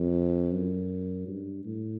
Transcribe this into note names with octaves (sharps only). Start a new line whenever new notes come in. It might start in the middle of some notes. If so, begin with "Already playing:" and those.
Already playing: F2
F#2
G2
A2